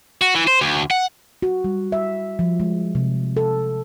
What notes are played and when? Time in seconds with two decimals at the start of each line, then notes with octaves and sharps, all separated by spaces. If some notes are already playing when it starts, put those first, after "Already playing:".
0.22 F#4
0.35 E3
0.48 C5
0.61 D2
0.91 F#5
1.42 F#4
1.64 G3
1.92 E5
2.39 F3
2.60 G#3
2.95 C3
3.37 A4